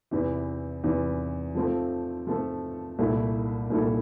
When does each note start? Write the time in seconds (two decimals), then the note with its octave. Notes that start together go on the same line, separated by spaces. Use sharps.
0.11 E2 C3 E3
0.84 E2 C3 E3
1.55 F3 A3 C4 F4 A4
2.27 F3 A3 C4 F4 A4
2.99 C2 A#2 A3 E4 A4
3.70 C2 A#2 A3 E4 A4